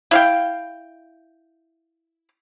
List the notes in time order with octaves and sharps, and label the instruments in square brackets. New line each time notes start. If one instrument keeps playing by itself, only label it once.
[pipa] E4 F5 G5